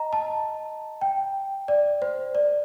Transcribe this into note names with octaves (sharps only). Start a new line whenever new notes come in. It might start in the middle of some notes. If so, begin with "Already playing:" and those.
Already playing: D#5 A#5
A5
G5
D5
C5
D5